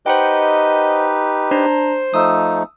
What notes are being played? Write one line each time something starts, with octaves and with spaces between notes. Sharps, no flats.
D#4 G4 B4 C5 D#5 F#5 G5
D4 C5 A#5
F3 A3 D#4 D#6 E6